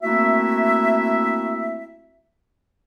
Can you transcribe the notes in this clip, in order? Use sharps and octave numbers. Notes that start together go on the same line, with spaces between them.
A3 A#3 C4 E4 F#4 E5